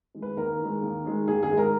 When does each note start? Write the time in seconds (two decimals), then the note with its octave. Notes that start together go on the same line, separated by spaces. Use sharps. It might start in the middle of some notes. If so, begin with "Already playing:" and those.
0.15 D#3 G#3
0.22 B4
0.37 D#2 A#4
0.60 D#3 G#3
0.82 D#2
1.05 D#3 G#3
1.28 D#2 G#4
1.43 G#4
1.50 D#3 G#3
1.57 A#4